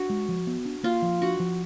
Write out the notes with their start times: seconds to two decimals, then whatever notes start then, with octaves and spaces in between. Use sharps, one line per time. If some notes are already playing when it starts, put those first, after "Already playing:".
Already playing: D4 F#4
0.10 G#3
0.29 F3
0.47 B3
0.65 D4
0.83 A#3 F4
1.02 F3
1.22 D4 F#4
1.40 F3